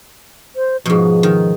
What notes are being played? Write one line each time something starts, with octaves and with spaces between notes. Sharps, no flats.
C5
G#2 B2 F3
D#3